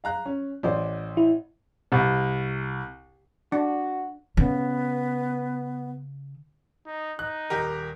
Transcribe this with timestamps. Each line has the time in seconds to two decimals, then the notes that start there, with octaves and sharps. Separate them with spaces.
0.04 F5 A#5 F#6
0.26 C#4
0.63 A1 C5 D5
1.17 E4
1.92 C2
3.52 D4 F#4
4.37 C#3 B3
6.86 D#4
7.19 D#4 F#6
7.50 D#1 G4 A#4